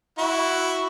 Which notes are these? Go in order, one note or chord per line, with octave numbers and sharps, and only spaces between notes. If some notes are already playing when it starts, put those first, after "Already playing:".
E4 F#4